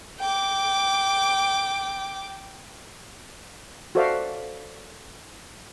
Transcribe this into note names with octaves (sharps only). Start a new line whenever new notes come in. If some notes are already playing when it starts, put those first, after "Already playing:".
G5 D6
F#4 A4 C5 D5 E5 F5